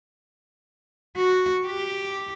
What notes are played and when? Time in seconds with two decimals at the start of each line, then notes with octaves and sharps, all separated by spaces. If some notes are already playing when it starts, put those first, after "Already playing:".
1.17 F#4
1.67 G4